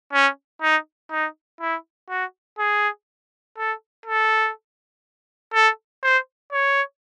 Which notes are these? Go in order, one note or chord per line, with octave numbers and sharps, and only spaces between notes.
C#4
D#4
D#4
E4
F#4
G#4
A4
A4
A4
C5
C#5